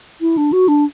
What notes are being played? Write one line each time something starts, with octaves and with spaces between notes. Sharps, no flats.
E4
D4
F#4
D4